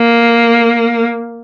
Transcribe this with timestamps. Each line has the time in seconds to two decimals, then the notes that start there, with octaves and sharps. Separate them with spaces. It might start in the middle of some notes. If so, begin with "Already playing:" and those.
Already playing: A#3